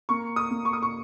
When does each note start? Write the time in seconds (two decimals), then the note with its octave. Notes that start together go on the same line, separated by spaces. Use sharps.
0.09 A#3 C#6
0.36 D#6
0.50 A#3
0.65 C#6
0.73 D#6
0.82 C#6